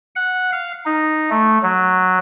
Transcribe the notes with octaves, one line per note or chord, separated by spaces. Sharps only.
F#5
F5
D#4
A3
F#3